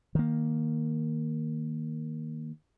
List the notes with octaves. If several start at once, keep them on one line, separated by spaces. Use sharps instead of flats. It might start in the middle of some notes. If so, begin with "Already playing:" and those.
D#3 A#3